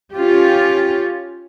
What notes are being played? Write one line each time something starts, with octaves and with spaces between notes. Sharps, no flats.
C#4 F4 G4